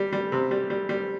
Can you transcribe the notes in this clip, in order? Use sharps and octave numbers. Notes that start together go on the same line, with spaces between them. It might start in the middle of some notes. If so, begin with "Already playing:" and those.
Already playing: G3
G3
C3
G3
G3
G3